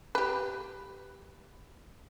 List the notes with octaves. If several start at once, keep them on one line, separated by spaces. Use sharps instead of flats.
G4 B4